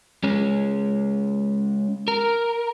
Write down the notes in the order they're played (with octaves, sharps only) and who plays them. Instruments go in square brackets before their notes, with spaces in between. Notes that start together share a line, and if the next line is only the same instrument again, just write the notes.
[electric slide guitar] G#3 C#4
A#4